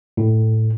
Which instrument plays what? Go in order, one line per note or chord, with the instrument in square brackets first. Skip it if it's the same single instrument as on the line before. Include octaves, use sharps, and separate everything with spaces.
[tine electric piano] A2